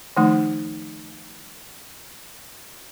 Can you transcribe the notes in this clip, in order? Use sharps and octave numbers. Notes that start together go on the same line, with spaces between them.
D#3 F3 A3 D#4